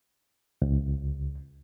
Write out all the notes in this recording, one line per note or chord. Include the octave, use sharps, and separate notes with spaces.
C#2